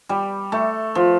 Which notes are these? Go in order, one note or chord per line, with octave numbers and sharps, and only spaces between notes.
G3
A3
F3